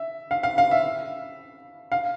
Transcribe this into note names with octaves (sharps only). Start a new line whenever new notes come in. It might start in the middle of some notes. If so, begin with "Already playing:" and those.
Already playing: E5
F5
F5
F5
E5
F5